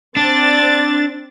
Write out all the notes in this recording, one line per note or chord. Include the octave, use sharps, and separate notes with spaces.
C4 D4 A6